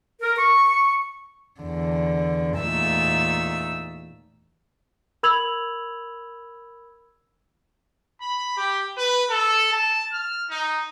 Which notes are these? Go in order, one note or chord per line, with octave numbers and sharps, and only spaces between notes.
A#4
C#6
E2 D3
E2 A#2 A3 D#4 E5 E6
A#4 B5 E6 G#6 F7 F#7
B5
G4
B4
A4
A5
F6
D#4